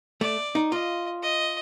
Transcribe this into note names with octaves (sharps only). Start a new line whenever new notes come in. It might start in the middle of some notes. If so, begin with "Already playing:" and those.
A3 D5
D#4
F4 D#5
D#5